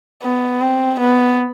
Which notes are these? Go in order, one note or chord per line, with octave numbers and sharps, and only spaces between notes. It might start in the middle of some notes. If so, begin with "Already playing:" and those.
B3
C4
B3